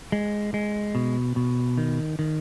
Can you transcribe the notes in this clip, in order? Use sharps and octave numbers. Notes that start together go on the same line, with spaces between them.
G#3
G#3
B2
B2
D#3
D#3